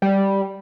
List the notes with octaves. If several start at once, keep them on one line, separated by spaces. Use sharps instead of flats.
G3